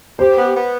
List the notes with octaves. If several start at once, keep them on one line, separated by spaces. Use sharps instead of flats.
G4 C5
B3
B3